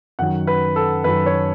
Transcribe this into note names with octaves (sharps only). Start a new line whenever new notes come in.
F#2 D#3 F#3 F#5
B4
A4
F#2 D#3 F#3 B4
C#5